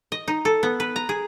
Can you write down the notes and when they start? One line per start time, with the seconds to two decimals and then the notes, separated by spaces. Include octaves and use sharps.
0.12 D#5
0.28 D#4
0.45 A4
0.63 B3
0.80 B4
0.96 A#5
1.09 G#4